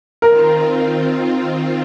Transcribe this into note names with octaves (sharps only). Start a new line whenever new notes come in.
D#3 C4 F4 A#4